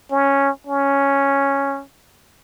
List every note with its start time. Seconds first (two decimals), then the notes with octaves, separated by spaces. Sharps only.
0.11 C#4
0.67 C#4